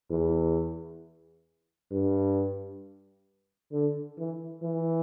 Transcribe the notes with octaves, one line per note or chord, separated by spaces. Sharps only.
E2
G2
D3
E3
E3